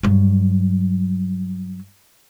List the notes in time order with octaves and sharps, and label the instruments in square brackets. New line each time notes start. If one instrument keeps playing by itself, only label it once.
[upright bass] G2 F#3